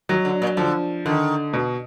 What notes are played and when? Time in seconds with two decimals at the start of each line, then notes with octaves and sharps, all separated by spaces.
0.09 D#3 F#3
0.25 D3
0.42 A#2
0.57 D3 F3
1.06 D3 D#3
1.53 B2